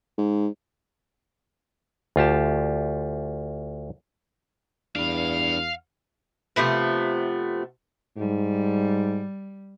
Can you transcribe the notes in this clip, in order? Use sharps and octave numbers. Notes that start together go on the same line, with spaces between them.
G#2
D2 F4 G4 A5
E2 D4 B4 F5
C3 F3 A3 B3
G#2 G3